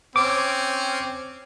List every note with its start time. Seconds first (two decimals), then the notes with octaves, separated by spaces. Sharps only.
0.16 C4 C#4 D6